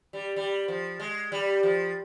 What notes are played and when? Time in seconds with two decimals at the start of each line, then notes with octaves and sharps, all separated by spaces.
0.13 G3
0.36 G3
0.68 F3
1.00 G#3
1.32 G3
1.63 F3